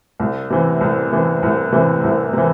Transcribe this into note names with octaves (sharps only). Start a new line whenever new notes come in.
C2
C3 E3
C2
C3 E3
C2
C3 E3
C2
C3 E3